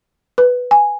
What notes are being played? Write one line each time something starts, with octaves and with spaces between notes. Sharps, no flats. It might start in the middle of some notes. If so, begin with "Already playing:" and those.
B4
G#5